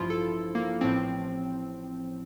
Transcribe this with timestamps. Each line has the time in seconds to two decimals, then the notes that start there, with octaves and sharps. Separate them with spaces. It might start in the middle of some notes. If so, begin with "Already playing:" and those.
Already playing: A1 G2 F3 E4 F4
0.10 A4
0.55 A#3
0.81 A1 A2 F3 C4